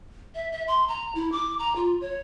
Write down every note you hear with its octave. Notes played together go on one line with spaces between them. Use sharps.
E5
E5
C6
A#5
E4
D6
A#5
F4
C#5